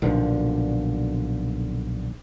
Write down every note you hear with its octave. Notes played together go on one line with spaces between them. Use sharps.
B1 A#2 D3 F3